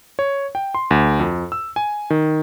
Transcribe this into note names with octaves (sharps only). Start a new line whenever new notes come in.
C#5
G5
C6
D2
F2
E6
G#5
D#3